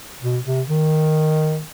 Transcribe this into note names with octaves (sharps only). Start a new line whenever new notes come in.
B2
C3
D#3